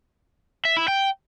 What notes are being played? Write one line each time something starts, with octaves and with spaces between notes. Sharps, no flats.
E5
E4
G5